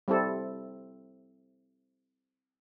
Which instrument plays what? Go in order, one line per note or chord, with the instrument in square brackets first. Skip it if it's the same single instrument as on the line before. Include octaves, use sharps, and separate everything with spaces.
[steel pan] G3 C4 E4 A4